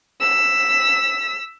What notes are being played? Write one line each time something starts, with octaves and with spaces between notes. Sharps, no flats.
E6 B6